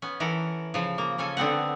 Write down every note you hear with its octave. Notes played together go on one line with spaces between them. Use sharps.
B3 C#4
E3 A4 A#4 F#5
C#3 F3
A#3
C#3 C#4 A4 G#5
D3 B3 C4 F#5